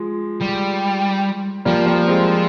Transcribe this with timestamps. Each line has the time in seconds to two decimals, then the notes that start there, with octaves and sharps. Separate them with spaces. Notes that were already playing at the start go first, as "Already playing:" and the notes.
Already playing: F3 G#3
0.41 G3
1.65 F3 G3 A#3
1.86 G3 A#3
2.07 G#3 C4